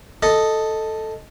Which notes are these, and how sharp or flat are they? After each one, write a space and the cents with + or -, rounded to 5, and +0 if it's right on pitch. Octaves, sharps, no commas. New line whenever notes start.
A4 +0 D#5 +0